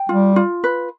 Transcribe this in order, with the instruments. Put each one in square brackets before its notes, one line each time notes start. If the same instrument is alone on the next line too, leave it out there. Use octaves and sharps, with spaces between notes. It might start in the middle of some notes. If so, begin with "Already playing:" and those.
Already playing: [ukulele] G5
[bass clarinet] G3 [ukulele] F4
[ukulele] F4
B4